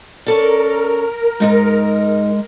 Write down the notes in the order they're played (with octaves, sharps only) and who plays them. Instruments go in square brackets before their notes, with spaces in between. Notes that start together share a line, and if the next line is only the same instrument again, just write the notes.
[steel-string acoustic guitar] C#4 A4 D5 [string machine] A#4
[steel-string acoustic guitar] G#2 D#4 D#5 [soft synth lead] G#3